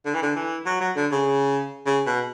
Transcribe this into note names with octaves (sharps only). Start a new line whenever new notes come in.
D3
E3
D3
E3
F#3
F#3
D3
C#3
C#3
B2